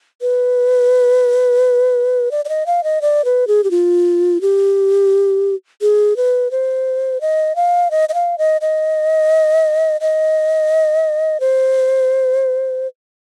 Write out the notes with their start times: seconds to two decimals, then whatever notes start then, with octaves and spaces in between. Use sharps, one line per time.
0.21 B4
2.31 D5
2.45 D5
2.49 D#5
2.66 F5
2.84 D#5
3.02 D5
3.25 B4
3.48 G#4
3.64 G4
3.71 F4
4.41 G4
5.82 G#4
6.17 B4
6.51 C5
7.21 D#5
7.56 F5
7.91 D#5
8.09 D#5
8.14 F5
8.38 D#5
8.61 D#5
10.01 D#5
11.40 C5